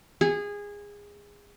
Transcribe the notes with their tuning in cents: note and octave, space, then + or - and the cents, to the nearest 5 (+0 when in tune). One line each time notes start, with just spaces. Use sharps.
G#4 -20